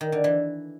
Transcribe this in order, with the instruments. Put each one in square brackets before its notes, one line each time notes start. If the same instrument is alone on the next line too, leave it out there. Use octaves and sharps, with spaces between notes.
[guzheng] D#3
D3
E3